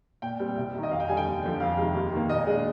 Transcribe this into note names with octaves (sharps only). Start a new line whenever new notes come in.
A#2 G5
G3 C4
C2
C3 D#3
D#5
F2 F5
G5
D3 G3 G#5
G5
D#2
D3 F3
F2 F5
C3 D#3 G#3
D#2
D#3 A#3
A#2 D#5
G#3 D4